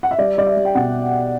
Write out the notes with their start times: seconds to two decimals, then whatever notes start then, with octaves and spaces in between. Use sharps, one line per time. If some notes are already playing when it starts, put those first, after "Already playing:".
0.03 F#5
0.11 E5
0.19 G3 D5
0.37 G3 D5
0.46 E5
0.56 G3
0.65 G5
0.75 B2 F#5